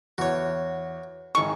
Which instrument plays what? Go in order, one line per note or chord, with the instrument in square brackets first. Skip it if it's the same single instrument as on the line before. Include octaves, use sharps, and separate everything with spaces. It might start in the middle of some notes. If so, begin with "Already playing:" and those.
[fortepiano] E2 [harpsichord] F#4 C#5
[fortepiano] G#1 D#4 G#4 [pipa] C#6